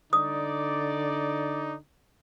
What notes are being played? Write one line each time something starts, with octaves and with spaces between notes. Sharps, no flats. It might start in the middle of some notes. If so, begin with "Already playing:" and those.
D3 D#4 D5 D#6